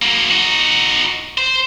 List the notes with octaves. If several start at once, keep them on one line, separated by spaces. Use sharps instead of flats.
F#3 A#3
D#4 F#4
C5